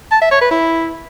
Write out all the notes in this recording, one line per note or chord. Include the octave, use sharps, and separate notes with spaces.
A5
E5
C#5
B4
E4